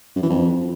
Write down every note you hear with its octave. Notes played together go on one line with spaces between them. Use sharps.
F#2
E3
F2